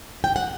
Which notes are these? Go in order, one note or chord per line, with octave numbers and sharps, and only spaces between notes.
G5
F#5